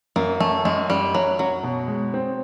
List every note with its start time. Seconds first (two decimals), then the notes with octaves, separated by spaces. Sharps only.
0.16 F#2 A#3
0.40 F#2 A3
0.65 F#2 G#3
0.90 F#2 G3
1.15 F#2 F#3
1.39 F#2 F#3
1.63 B2
1.88 G#3
2.14 C4